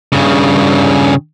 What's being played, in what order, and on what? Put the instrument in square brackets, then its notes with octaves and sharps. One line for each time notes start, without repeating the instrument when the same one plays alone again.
[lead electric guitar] G2 C#3